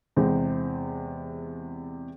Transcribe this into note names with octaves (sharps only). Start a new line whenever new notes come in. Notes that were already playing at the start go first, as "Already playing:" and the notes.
E2 C3 G#3 C5